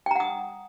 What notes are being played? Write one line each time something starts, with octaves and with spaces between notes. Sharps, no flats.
F#5 G5 A#5 D#6